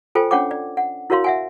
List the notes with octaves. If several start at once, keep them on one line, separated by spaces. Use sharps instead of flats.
F4 A4 C5 G5 G#5
C#4 D4 C#5 F#5 G5 D6
D5
F#5
E4 F#4 A#4 C#5 F5 C6
E5 F#5 G#5